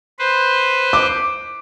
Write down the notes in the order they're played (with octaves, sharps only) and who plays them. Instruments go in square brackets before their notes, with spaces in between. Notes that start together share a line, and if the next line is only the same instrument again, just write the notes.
[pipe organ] B4 C5
[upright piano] D6